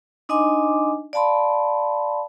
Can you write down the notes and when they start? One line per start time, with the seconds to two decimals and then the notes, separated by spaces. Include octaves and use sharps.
0.29 D4 D#4 D#5 G#5 C6 D6
1.13 D5 F5 A5 B5 C6